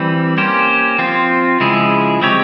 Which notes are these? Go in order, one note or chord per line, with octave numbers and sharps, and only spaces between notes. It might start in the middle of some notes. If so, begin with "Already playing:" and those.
Already playing: E3 G3 C4
A#3 C#4 G4 C5
F3 C4 F4
C#3 F3 G#3 E4 G#4
G#3 C4 G4 C#5